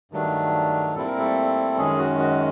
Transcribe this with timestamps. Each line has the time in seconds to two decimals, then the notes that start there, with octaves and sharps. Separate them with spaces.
0.12 G2 D#3 F#3 A3 D4
0.94 A#2 G3 C4 E4 A4
1.07 A#4
1.18 A3 A4
1.77 F#2 D#3 G#3 C#4 G#4
1.99 F#4
2.19 F#4